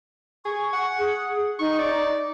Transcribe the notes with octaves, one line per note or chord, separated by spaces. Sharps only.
G#4 C#6
F#5
G#4
D#4 C#6
D5